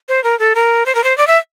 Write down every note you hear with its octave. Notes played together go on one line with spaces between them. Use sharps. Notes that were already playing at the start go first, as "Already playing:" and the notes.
C5
A#4
A4
A#4
C5
A#4
C5
D5
E5